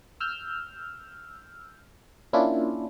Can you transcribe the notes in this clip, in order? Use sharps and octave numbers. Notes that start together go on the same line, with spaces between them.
E6 F6 G6
A#3 C#4 D4 E4 F4